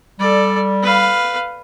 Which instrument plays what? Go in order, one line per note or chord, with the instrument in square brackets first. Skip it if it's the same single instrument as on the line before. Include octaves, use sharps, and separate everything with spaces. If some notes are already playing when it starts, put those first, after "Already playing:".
[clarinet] G3 [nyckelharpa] A4 D5
[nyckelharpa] B4 F5